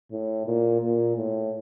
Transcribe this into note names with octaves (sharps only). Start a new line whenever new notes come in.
A2
A#2
A#2
A2